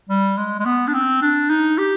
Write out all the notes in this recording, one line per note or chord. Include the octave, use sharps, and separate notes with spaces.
G3
G#3
G#3
B3
D4
C4
D4
D#4
G4